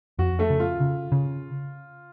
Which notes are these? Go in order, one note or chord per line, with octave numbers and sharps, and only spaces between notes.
F2 F#4
A3 A4
C#3
F4
C#3
C#3